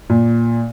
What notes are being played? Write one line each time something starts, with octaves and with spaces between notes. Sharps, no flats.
A#2